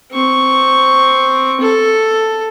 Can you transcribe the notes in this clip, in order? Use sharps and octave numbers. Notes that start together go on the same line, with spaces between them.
C4 C#6
A4